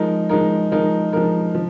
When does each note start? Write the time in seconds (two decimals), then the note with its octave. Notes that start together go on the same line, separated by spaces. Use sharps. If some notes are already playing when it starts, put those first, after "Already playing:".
Already playing: F3 G#3 D#4 A#4
0.29 F3 G#3 D#4 A#4
0.72 F3 G#3 D#4 A#4
1.13 F3 G#3 D#4 A#4
1.55 F3